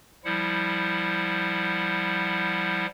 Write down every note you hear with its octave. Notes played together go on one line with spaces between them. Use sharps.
F3 G3 E4 F#5